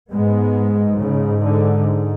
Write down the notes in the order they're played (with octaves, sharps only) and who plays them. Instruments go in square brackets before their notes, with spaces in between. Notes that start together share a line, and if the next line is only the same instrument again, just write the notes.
[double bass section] G#2 G#3 B3
C#3
D3